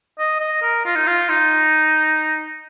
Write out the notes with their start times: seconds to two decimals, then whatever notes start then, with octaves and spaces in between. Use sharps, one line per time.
0.19 D#5
0.40 D#5
0.62 A#4
0.86 F4
0.96 D#4
1.07 F4
1.29 D#4